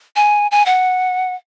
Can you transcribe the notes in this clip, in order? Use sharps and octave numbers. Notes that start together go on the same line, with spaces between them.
G#5
G#5
F#5